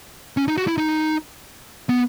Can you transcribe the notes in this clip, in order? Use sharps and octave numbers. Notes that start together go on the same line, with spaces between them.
C#4
D#4
F#4
E4
D#4
B3